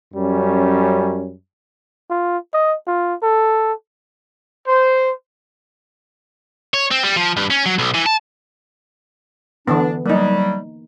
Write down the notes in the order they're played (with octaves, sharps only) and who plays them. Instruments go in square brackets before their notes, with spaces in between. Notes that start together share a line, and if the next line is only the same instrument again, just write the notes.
[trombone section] F#2 G3 C#4
[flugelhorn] F4
D#5
F4
A4
[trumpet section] C5
[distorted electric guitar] C#5
C4
G3
F3
G2
C#4
F#3
B1
E3
A5
[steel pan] D3 E3 B3 [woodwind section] D4
[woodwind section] F#3 G3 [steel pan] A#3 D#4